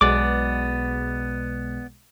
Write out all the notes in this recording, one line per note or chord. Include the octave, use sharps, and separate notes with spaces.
B1 B2 G#3 B3 D5 D6